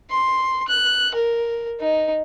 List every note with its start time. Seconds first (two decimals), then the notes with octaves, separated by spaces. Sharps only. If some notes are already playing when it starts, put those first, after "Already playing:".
0.10 C6
0.68 F#6
1.14 A#4
1.80 D#4